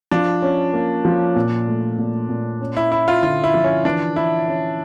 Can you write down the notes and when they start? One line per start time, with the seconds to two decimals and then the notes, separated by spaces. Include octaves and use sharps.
0.11 F3 D4
0.42 C#4
0.73 A#3
1.05 F3
1.35 A#2
1.67 A3
1.98 A#2
2.29 A#2
2.60 C#4
2.77 E4
2.91 C#4 E4
3.08 F4
3.22 D3 F4
3.44 E4
3.54 F3
3.64 C#4
3.85 E3 D4
4.16 E3 E4
4.48 C#4